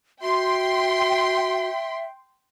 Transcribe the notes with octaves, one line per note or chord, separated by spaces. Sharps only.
F#4 E5 G5 C6